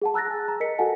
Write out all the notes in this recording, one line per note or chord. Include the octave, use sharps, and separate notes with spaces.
G#4 F#5 A5
A#5 E6 F#6 A6 A#6
G#5
A#5
A#4 D#5 B6 C#7
F#4 A4 D#5 F#5 G#5 A5